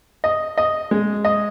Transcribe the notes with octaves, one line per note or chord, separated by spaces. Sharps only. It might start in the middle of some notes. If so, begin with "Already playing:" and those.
D#5
D#5
G#3
D#5